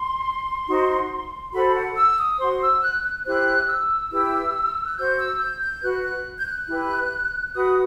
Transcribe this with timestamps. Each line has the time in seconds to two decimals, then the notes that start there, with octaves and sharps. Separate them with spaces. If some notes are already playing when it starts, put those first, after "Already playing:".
Already playing: C6
0.67 D#4 F#4 C5
1.53 F#4 A4 C5 B5
1.75 F#5
1.96 E6
2.18 D#6
2.38 F#4 C5 C6
2.60 E6
2.82 F#6
3.03 F#6
3.25 E4 G4 C5 F#6
3.67 E6
4.10 E4 G4 B4 E6
4.86 F#6
4.96 F#4 C5 G6
5.17 E6
5.40 G6
5.60 G6
5.82 F#4 B4 F#6
6.03 F#6
6.40 G6
6.46 F#6
6.68 E4 G4 B4
7.54 F#4 B4 D#6